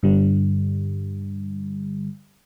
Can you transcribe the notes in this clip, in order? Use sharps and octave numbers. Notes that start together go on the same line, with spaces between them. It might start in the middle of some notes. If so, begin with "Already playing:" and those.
G2 D3 G3